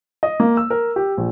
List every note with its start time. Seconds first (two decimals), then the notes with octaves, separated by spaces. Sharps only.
0.23 D#5
0.40 A#3
0.57 E6
0.70 A#4
0.96 G4
1.17 A#1